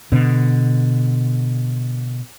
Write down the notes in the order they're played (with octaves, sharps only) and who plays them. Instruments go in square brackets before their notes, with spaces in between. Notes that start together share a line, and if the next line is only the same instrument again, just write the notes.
[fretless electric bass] B2 D3